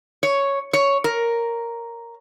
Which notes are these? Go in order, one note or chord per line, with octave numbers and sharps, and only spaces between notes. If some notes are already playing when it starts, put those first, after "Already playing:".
C#5
C#5
A#4